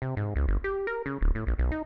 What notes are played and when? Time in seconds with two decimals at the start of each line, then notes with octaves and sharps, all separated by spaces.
0.02 C3
0.17 G#2
0.36 C#2
0.48 G1
0.64 G4
0.87 A#4
1.06 C#3
1.21 D1
1.35 A2
1.47 A#1
1.58 B1
1.72 D#4